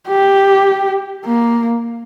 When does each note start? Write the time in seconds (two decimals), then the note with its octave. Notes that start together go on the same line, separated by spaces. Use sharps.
0.09 G4
1.26 A#3